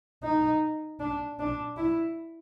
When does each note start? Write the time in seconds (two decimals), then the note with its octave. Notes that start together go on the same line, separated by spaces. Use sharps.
0.23 D#4
1.00 D4
1.39 D4
1.77 E4